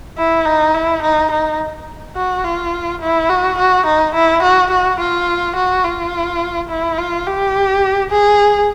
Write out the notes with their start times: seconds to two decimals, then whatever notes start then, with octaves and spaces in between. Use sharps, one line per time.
0.18 E4
0.46 D#4
0.74 E4
1.02 D#4
1.31 D#4
2.16 F#4
2.44 F4
3.01 E4
3.29 F#4
3.58 F#4
3.86 D#4
4.15 E4
4.43 F#4
4.71 F#4
5.00 F4
5.56 F#4
5.84 F4
6.69 E4
6.98 F4
7.27 G4
8.11 G#4